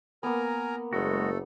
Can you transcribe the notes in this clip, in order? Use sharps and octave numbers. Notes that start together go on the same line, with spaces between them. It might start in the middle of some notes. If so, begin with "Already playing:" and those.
A#3 B3 A#4 G#5 A#5
F#1 G#3 A3 F#4 A4